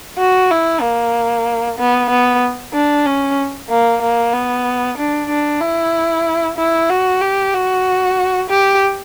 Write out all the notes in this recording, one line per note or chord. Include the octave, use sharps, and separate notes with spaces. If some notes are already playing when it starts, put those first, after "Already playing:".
F#4
E4
A#3
B3
B3
D4
C#4
A#3
A#3
B3
D4
D4
E4
E4
F#4
G4
F#4
G4